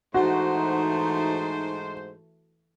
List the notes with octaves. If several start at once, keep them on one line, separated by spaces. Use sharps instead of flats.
G#2 E3 A3 D#4 F#4 C5